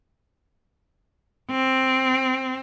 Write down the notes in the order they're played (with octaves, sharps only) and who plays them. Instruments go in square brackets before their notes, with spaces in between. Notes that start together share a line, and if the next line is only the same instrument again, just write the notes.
[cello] C4